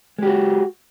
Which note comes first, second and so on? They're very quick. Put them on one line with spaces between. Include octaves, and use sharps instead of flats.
G#3 G4 F#4